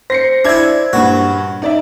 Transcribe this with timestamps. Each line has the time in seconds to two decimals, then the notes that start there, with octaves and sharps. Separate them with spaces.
0.10 C5 A#6 C7 C#7
0.45 D4 E4 E5 G#6
0.93 G2 A#2 F#4
1.62 D#4 D5 E5